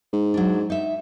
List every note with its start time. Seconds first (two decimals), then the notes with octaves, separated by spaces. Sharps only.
0.13 G#2
0.34 F#3 D4
0.70 D#4 E5